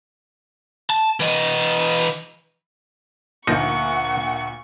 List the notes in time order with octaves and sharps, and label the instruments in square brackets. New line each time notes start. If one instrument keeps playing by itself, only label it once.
[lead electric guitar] A5
E3 D#5
[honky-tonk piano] D2 A#2 [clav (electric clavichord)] F3 D#4 [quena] F#5 [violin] C#6